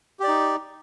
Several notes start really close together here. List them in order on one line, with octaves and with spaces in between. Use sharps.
G4 D5 D#4